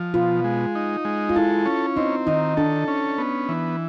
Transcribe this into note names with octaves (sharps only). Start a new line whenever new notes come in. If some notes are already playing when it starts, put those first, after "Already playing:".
Already playing: F3
B2 F4
G#3
D#4
G#3
F4
E4 A4
C#4
C4 D#4
D#3 D#4
D4 A4
C#4
B3
E3